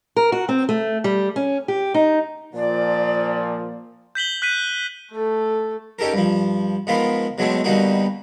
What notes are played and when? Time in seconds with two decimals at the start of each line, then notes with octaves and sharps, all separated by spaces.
0.16 A#4
0.32 F#4
0.49 C4
0.69 A3
1.04 G3
1.36 C#4
1.68 G4
1.94 D#4
2.54 A#2 F3 D5
4.15 G6 B6 F#7 G7
4.42 F#6 B6 D#7
5.11 A3 A4
5.99 C#4 D#4 G4 A4 A#4
6.13 G2 F3
6.87 G#2 F3 B3 F4 A#4 B5
7.38 B2 F#3 G#3 A3 C4
7.64 B2 D3 G3 A#3 D#4 F#4